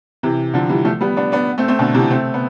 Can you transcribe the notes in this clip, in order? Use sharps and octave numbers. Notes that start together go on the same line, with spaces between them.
C3 E3
D3 F3
E3 G3
F3 A3
G3 B3
B3 D4
B3 D4
A3 C4
A3 C4
B2 D3
C3 E3
A3 C4
B3